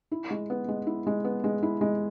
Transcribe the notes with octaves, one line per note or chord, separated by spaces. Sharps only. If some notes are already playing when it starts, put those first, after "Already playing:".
E4
G#3
B3
G#3
E4
G#3
B3
G#3
E4
G#3